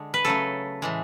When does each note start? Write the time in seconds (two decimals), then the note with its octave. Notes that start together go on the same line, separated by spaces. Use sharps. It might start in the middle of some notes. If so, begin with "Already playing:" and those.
Already playing: D3 G#3
0.14 B4
0.25 C#3 F#3 A3 A4
0.82 A2 E3 G#3